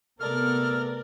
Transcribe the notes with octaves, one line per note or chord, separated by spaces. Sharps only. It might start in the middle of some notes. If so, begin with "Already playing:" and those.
C3 A3 B3 A4 A#4 D5 F6